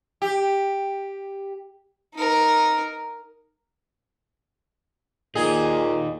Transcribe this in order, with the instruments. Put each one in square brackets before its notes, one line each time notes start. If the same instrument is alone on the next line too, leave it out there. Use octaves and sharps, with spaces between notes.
[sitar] G4
[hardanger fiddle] D#4 A#4
[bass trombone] A#2 [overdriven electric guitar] A#3 D#4 [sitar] G#4